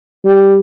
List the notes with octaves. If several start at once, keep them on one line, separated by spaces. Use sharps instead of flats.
G3